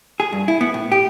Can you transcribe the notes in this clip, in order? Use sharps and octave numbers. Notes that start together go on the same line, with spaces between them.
G#4
G2
E4
B3
A2
G4